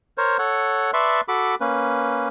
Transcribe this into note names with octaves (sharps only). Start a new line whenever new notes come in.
A#4 C5 C#5
A4 C#5 F#5
B4 D5 E5 A5 C6 C#6
F#4 A4 B5 D6
A#3 C#4 B4